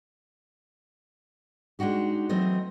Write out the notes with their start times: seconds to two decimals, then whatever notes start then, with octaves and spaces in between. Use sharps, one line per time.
1.79 G#3 D4 D#4 F#4 G4
2.29 E3 F#3 A3 C4 C5 D#5